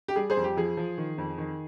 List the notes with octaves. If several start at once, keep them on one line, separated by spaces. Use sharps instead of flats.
G4
G3 G#4
G#4 C5
F2
G4
F3 G#4
F3
D#3
F2
D#3